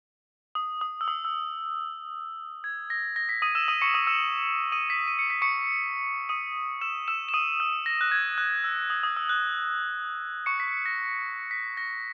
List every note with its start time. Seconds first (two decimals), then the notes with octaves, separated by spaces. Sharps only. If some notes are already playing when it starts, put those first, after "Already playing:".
0.55 D#6
0.81 D#6
1.01 E6
1.08 D#6
1.25 E6
2.64 G#6
2.90 A#6
3.16 A#6
3.29 B6
3.42 D#6 D#7
3.55 E6 E7
3.68 D#6 D#7
3.81 C#6 C#7
3.94 D#6 D#7
4.07 E6 E7
4.72 D#6 D#7
4.90 B6
5.08 D#7
5.19 C#7
5.30 B6
5.42 C#6 C#7
6.29 D#6 D#7
6.81 E6 E7
7.08 E6 E7
7.29 E7
7.34 D#6 D#7
7.60 E6
7.86 A#6
8.01 F#6
8.12 G#6
8.38 F#6
8.64 E6
8.90 D#6
9.03 D#6
9.17 E6
9.29 F#6
10.46 C#6 C#7
10.60 B6
10.86 A#6
11.51 B6
11.77 A#6